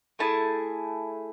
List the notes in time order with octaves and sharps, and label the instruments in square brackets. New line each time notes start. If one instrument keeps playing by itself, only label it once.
[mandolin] A3 E4 G#4 A5